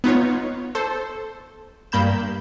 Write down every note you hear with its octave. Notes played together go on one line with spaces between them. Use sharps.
B3 D#4 F4 C#5
A4 C5
G2 A#3 B5 G6 E7